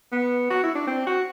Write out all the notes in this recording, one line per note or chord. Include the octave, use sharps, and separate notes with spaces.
B3
F#4
E4
D4
C4
F#4